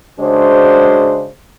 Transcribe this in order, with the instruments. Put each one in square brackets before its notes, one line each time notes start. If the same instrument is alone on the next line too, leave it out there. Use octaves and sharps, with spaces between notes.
[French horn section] C#3 G#3 D4 F#4 C5